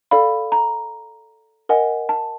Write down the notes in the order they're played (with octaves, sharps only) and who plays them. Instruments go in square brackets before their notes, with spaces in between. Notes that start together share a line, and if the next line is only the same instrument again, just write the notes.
[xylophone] A4 D5 F5 B5
A#5
A#4 D#5 F#5 G#5
A5